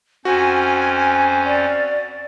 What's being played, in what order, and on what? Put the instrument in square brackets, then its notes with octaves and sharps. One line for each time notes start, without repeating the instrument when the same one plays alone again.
[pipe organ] F2 C#4 C5 [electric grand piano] F#4 [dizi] G#5
[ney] D5